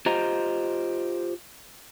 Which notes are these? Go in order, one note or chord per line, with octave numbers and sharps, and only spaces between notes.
F4 G4 C5 D#5 A#5